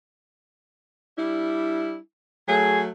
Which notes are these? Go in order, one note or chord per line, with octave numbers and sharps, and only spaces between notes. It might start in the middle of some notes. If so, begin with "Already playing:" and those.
G3 D4 E4
F#3 A3 G#4